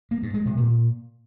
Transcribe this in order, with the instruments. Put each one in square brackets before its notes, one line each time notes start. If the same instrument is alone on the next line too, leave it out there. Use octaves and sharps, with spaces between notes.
[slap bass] A#3
G2
G#3
C3
A#2